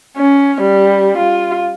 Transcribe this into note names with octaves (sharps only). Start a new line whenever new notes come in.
C#4
G3
F4